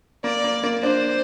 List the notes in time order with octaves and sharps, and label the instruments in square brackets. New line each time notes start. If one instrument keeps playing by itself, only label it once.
[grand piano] A#3 [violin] D5
[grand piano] A#3
A#3
[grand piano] D4 [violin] C5